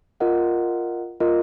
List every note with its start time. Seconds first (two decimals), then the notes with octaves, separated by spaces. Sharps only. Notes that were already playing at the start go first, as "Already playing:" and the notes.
0.20 F4 A#4 D#5 F#5
1.20 F4 A#4 D#5